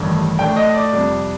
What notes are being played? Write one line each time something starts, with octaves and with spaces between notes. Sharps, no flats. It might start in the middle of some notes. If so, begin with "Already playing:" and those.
Already playing: A1 G2 D#3 A3
A2 A3 D4 G5
D#5
D5
F2 C3 G3 D4